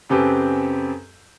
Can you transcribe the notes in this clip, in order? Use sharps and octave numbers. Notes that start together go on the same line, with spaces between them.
F#2 C#3 C4 G4 A4 B4